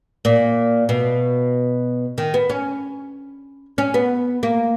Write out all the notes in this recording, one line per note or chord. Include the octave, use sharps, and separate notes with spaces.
A#2
B2
D#3
B3
C#4
C#4
B3
A#3